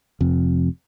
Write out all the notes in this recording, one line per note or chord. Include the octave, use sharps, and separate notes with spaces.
F1 F2